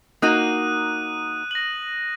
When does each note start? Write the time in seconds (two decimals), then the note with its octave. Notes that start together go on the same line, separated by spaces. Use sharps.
0.22 A#3 D#4 F#4 D#6 F#6 D#7
1.51 A#6 F#7